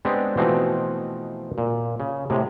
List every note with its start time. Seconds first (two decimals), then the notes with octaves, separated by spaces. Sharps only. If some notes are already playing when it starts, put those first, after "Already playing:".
0.05 G#3 B3 C4 D4 G4 G#4
0.37 B2 E3 F3 A3 C4 D#4
1.58 A#2
2.00 C#3
2.30 A2 C3 G#3